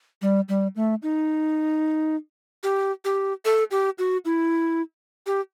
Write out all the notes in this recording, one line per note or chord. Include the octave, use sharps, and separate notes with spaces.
G3
G3
A3
D#4
G4
G4
A4
G4
F#4
E4
G4